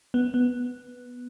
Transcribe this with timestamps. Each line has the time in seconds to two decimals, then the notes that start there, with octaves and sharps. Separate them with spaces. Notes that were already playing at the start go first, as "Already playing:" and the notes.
0.14 B3
0.34 B3